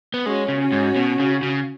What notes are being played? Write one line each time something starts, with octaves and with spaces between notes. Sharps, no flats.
B3
G#3 C#4 F#4
C#3
C#4 F#4
G#2
B2
C#3
C#3